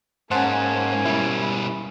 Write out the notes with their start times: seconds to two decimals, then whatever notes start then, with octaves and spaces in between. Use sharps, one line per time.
0.31 G#2 A#3 C#4 C5 F#5 A5
1.06 B2 G3 E4